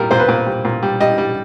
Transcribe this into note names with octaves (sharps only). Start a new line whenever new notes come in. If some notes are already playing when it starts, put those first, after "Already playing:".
Already playing: A#2 G3 A#4
A#2 C5
B4
A#2
G3
A#2
G3
G3 D#5
G3